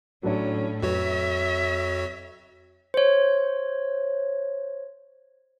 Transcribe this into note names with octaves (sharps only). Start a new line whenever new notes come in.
A2 F#3 C#4 D4 C#5
F2 F#3 F#4 B4 C#5 E5
C5 C#5